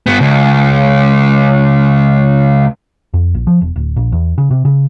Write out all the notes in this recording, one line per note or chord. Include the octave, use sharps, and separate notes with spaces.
G2 B3
C#2
F2
A#1
F3
E1
D1
A#1
E2
C#3
C3
C#3